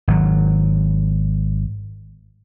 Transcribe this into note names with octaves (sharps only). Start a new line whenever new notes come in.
G#1 F#3